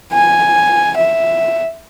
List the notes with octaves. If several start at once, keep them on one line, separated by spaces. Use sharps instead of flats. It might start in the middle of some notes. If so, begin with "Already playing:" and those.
G#5
E5